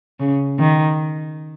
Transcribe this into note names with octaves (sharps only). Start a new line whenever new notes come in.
C#3
D#3